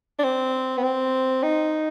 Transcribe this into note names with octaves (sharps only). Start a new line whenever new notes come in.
D4
C4
B3
C4
D#4